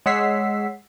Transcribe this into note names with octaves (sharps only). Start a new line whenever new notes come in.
G#3 C#5 F#5 E6 B6 C7